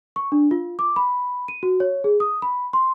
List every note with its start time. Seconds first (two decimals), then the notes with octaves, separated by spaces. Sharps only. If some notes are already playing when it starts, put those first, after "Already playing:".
0.16 C#6
0.32 D4
0.51 F4
0.79 D6
0.96 B5
1.48 D#7
1.63 F#4
1.80 C#5
2.04 G#4
2.20 D#6
2.42 B5
2.73 C6